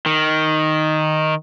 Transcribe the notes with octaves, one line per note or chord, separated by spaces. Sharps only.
D#3